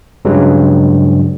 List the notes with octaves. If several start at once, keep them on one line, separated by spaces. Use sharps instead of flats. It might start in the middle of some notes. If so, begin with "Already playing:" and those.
G2 C#3 F#3 G#3